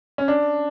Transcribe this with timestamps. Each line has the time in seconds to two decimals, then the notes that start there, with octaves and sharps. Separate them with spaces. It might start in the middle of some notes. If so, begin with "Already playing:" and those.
0.18 C#4
0.28 D4